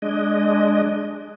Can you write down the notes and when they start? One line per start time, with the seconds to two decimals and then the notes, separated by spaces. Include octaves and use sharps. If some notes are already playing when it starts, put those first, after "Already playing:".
0.02 G#3 D4 D#5